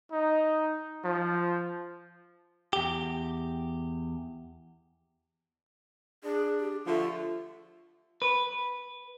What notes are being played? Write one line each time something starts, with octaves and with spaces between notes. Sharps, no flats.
D#4
F3
E2 G4
D4 G#4
G4
D3 F3 A3 F4
B4